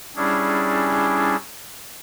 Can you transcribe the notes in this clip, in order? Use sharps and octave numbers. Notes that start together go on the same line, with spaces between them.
G3 C#4 D4 E4 G#4